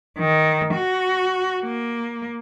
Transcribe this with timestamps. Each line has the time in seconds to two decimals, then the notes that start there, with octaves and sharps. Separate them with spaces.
0.18 D#3
0.74 F#4
1.63 A#3